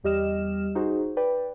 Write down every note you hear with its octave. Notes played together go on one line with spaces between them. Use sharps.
E2 G3 G4 D#5 F6 E7
D#4 F#4 G#4 C5
B4 D5 G5